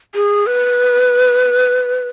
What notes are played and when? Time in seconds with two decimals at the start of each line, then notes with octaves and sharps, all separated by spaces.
0.15 G#4
0.47 B4